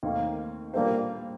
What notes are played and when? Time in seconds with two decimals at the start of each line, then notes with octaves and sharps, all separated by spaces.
0.03 D#2 D#3 A3 A#3 C4
0.74 A#2 G3 A#3 D4 A4 C5